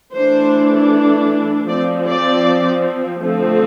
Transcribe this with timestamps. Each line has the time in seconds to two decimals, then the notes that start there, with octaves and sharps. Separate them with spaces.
0.13 E3 A3 D4 C5
1.69 F3 C4 D5
2.08 D5
3.23 D3 F3 A3 C4